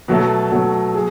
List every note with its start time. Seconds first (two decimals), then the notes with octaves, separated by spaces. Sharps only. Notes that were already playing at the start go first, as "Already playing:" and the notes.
0.08 B2 F#3 A3
0.52 B2 F#3 A3
0.95 G#4